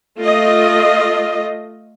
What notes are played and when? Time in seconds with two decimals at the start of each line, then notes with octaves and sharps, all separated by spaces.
0.20 A3 F4 D#5